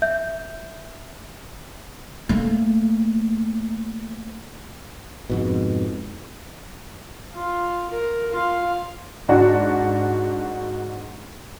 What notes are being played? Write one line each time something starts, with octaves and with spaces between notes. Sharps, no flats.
E5 G6
A3 A#3
F2 G#2 B2
F4
A#4
F4 F5
G#2 D4 F#4